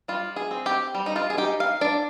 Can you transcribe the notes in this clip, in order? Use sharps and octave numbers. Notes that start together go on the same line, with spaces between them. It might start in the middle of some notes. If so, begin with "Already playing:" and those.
G3 F4
G#4
C4
G4
G3
D#4
F4
G#4
D#4 G4
F5
D4 D5